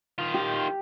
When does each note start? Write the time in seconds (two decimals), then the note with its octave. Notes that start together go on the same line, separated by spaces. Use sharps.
0.19 D#3 F4
0.34 G4